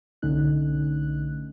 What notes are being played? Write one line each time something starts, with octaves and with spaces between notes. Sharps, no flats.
B1 D3 A3 C#4 D#4 F#6